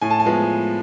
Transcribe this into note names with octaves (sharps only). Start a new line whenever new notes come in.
A2 G#5
A5
G#5
F3 G#3 B3